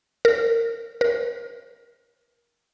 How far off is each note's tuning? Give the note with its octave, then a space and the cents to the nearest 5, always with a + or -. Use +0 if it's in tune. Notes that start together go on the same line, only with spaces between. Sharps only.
A#4 -20
A#4 +25